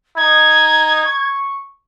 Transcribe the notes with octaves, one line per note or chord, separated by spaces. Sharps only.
D#4 G#6
C#6